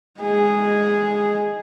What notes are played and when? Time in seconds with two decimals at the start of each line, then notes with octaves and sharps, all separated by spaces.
0.21 G#3 G#4